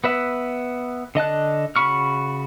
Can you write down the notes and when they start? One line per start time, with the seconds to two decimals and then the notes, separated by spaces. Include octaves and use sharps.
0.04 B3 B4 E5
1.15 D3 D#5 A5 F#6
1.76 C#3 F#4 B5 C#6 F6